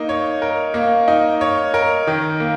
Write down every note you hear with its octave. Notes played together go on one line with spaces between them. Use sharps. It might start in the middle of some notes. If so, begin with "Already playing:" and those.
Already playing: A#3 D#4
C#5
A#4
A#3
D#4
C#5
A#4
D#3
A#3